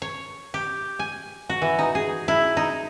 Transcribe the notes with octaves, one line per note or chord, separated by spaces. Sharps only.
C#5
G4
G#5
F#4
E3
D#4
G#4
E4
D#4